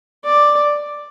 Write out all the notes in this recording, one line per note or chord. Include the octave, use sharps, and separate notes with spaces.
D5